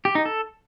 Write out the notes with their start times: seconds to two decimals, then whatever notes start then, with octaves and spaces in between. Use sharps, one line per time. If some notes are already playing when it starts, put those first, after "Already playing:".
0.05 G4
0.15 D#4
0.25 A4